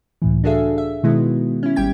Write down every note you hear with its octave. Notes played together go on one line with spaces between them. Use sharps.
C#2 A2 E3
D4 F#4 G#4 A4 E5 F5
E5
B2 D#3 G#3 B3 E4 F#4
C#4 E4
G#1 G3 G4 G5 G#6